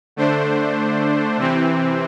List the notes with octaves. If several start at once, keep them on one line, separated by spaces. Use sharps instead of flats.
D3 A3 D4 C5
C3 E3 C4